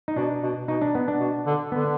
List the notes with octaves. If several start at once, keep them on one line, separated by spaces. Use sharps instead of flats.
D#4
B2 D4
B2
B2 D#4
D4
B3
D4
B2
D3
D3 B3